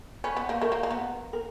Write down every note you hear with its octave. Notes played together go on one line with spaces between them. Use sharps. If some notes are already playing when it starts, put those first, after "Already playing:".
C#4 B4
B3
A#3
A3 A#4
A#3
A#3
B3
A#4